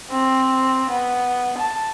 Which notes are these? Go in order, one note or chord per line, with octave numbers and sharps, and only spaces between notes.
C4
B3
A5